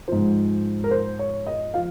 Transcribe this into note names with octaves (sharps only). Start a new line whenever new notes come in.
G#2 F3 C5
A#4
C5
C#5
D#5
F3 F5